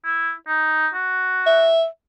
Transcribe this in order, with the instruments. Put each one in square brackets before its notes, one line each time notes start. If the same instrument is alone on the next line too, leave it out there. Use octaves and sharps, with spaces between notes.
[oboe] E4
D#4
F#4
[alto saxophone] E5